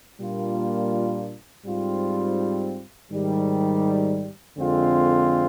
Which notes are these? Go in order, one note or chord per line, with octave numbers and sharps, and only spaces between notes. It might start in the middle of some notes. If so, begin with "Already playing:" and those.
A#2 G3 A#3 D4 F4
G#2 G3 C4 F4
G#2 D#3 G3
F2 D3 G#3 C4 F4